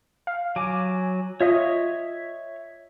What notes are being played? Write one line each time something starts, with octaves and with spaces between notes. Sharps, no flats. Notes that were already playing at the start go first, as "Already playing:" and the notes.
F5
F#3 G#5 D6
F4 C#5 D#5 E5 C#6